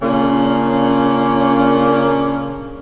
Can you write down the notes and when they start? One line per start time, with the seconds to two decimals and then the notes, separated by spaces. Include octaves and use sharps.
0.02 A#2 C#3 A#3 C#4 D4